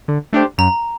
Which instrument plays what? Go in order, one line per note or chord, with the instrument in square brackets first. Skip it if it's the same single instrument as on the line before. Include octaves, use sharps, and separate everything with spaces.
[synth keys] D3
A3 D4 G4 C5
[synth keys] F#2 [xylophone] A#5